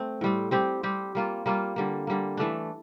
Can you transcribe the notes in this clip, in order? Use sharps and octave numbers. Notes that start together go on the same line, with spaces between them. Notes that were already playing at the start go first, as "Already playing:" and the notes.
Already playing: A3 C4
A2 G3 C4
G3 C4 G4
G3 C4 G4
G3 A#3 F4
G3 A#3 F4
D3 G3 A#3
D3 G3 A#3
E3 A3 D4